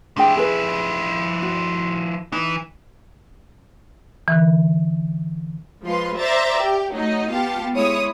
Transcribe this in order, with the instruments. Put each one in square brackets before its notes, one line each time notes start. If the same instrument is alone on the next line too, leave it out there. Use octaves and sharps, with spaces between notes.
[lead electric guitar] F3 E4 [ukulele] D4 G#4 G5
[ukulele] G#4 B4
F#4
[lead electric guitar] E3 [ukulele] D#4
[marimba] D3 E3
[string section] F3 G#3 F4 B4 C6
C5 D5 E5 A#5 A6
G4
F#3 A3 D#4 D#5
B3 F4 G4 F5 A5
G#3 E4 C#5 D#6